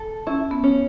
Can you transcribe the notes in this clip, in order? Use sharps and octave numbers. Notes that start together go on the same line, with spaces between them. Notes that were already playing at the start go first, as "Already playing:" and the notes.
Already playing: A4
C#4 E4
B3
C#4